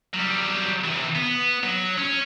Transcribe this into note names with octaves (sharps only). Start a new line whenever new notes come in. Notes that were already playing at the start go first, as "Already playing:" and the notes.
F#3 G3
C3 E3
B3
F#3
C#4